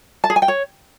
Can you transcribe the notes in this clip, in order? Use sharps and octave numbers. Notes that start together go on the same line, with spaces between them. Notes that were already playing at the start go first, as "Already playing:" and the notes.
A5
G#4
G#5
G5
C#5